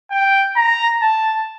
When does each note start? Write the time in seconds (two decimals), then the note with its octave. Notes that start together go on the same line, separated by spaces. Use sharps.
0.11 G5
0.56 A#5
1.02 A5